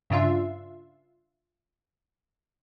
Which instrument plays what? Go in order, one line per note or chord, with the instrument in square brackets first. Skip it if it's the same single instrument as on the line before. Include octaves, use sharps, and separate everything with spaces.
[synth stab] G2 C#3 D4 F4 E5 C6